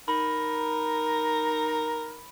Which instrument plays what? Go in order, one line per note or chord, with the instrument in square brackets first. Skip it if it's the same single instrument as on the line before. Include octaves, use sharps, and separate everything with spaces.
[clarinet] D#4 [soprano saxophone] A#4 [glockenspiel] B5